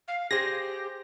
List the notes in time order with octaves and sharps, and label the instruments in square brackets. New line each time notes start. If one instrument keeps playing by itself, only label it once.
[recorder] F5
[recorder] G4 [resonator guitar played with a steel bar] G#4 C5 [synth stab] A#6